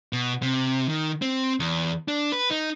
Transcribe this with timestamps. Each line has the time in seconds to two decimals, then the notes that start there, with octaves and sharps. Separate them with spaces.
0.13 B2
0.43 C3
0.89 D#3
1.22 C4
1.60 E2
2.08 D4
2.32 B4
2.50 D#4